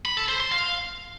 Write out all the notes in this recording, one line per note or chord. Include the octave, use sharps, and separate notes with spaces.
B5
A4
C5
C6
F5